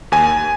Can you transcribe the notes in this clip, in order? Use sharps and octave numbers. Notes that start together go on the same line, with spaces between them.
D#2 G#5